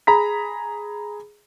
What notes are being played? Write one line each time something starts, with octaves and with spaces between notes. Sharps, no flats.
G#4 A#5 B5 B6